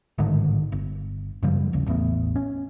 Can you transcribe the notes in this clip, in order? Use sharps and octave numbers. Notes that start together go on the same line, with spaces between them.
A1 G#2 D3 D#3
G1
F#2 C#3 F3 G3
D#1 G#1 C#3
A1 E2 A3 B3
C#4